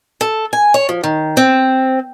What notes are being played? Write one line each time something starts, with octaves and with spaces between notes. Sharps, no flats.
A4
G#5
C#5
F3
D#3
C4